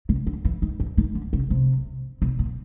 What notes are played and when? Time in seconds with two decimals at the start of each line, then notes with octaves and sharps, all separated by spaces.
0.09 C#3
0.27 D3
0.45 E3
0.62 D#3
0.80 E3
0.97 D#3
1.15 D3
1.33 C#3
1.50 C3
2.22 B2
2.39 A#2